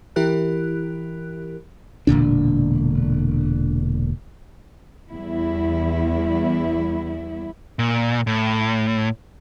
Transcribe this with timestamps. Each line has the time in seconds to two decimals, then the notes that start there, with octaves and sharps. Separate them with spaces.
0.16 E3 E4 G4 A#4 F#6
2.07 E1 A#2 D3 D4
5.10 E2 G3 B3 E4
7.79 A#2
8.27 A2